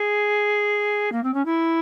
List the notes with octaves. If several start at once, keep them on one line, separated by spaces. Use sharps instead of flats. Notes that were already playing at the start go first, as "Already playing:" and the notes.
Already playing: G#4
A#3
C4
C#4
E4